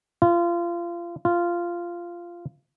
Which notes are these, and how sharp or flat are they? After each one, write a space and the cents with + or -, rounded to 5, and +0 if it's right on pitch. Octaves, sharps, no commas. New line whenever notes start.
F4 -25
F4 -10